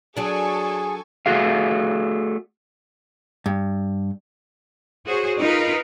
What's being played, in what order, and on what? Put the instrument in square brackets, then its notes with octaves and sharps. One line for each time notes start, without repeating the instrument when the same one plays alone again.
[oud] F#3 D4 [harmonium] G#4 [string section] A4 G#5 C#6
[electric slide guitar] A3 F#4 G#4 F5
[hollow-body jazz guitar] G2
[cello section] F#4 G#4 C5 C#5
D#4 F4 A#4 B4